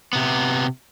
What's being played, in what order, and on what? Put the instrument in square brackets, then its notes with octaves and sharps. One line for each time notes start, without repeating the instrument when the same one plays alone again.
[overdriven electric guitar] C3 B3